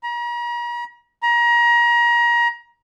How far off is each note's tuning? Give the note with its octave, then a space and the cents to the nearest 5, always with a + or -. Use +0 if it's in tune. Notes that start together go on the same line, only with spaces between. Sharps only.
A#5 +40
A#5 +30